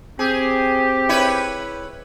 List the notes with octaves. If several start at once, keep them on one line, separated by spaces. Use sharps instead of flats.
C4 G4 G#4
E4 B4 C#5